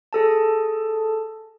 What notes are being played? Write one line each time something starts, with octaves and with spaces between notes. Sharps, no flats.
G#4 A4 A5